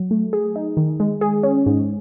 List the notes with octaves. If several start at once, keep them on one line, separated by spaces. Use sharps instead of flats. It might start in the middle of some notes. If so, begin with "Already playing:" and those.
Already playing: F#3
A3
G#4
D#4
D#3
G#3
G#4
C#4
G#2